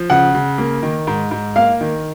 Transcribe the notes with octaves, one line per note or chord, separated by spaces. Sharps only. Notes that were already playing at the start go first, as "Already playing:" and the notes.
Already playing: F3
C#3 F#5
C#3
A#3
D#3
G#2
G#2
A#3 F5
D#3